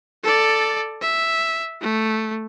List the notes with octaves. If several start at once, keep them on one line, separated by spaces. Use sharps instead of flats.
A4 D5
E5
A3